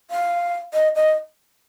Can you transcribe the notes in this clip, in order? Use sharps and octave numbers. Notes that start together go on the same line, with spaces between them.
F5
D#5
D#5